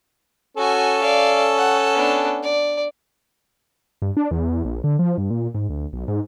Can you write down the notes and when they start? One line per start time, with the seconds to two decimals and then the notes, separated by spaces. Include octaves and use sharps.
0.57 C#4 F#4 A4 G#5
1.01 D5 F5
1.57 F#5
1.95 B3 D4
2.42 D5
4.02 G2
4.17 D4
4.31 E2
4.65 A#1
4.84 D3
4.99 F3
5.18 G2
5.30 A#2
5.55 G#2
5.69 D2
5.93 B1
6.08 G#2